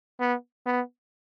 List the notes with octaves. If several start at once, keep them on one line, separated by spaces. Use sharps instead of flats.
B3
B3